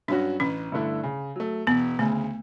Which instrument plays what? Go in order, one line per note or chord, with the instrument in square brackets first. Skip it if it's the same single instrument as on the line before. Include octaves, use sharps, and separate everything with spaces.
[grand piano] G2 F#3 C#4 F#4 [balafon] D4
[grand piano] A1 [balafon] C#4
[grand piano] G2 D3 A3 E4
C#3
F#3 A3
[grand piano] E1 [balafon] B3
[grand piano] D2 C#3 [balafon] A3